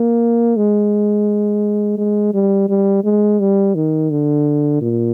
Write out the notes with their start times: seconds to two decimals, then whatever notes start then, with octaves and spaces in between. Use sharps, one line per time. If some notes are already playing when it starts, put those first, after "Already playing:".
Already playing: A#3
0.57 G#3
1.98 G#3
2.34 G3
2.69 G3
3.04 G#3
3.40 G3
3.75 D#3
4.10 D3
4.82 A#2